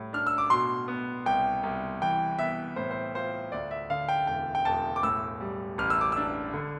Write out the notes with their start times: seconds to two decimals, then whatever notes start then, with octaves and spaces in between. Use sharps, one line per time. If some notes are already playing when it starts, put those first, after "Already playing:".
Already playing: A2 G3
0.13 D4 F6
0.27 E6
0.38 D6
0.50 B2 C6
0.88 B3
1.25 C2 G5
1.63 C2
2.01 E3 G5
2.39 B3 E5
2.76 A2 C5
2.91 C5
3.15 F4 C5
3.52 D2 D5
3.71 E5
3.90 D3 F5
4.09 G5
4.27 E1 G5
4.55 G5
4.65 E1 A5
4.96 D6
5.03 A2 E6
5.41 G3
5.78 A1 F6
5.90 E6
6.01 D6
6.12 D4 E6
6.53 D3